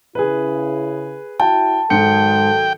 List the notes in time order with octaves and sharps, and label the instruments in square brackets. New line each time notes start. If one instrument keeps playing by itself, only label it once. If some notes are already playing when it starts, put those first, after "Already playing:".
[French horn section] C#3 E4 [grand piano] G#4 B4
[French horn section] E4 F#4 [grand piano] G5 [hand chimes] A5
[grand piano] G#2 C#7 [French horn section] D#3 F#3 A4 [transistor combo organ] G5